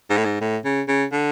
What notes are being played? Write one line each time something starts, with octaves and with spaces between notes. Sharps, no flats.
G#2
A2
G#2
A2
C#3
C#3
D3